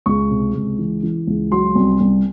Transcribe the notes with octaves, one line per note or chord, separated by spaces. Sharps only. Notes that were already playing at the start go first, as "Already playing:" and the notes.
C#2 C#6
C3
C#2
E3
E3
C#2
F#3 C6
C2
C2